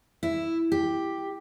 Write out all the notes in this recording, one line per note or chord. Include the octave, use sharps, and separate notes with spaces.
E4
G4